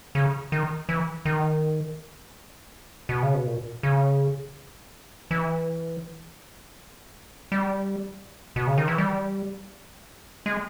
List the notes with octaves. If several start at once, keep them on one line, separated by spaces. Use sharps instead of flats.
C#3
D#3
E3
D#3
B2
C#3
B2
A#2
C#3
E3
G3
B2
C#3
D#3
E3
G3
G#3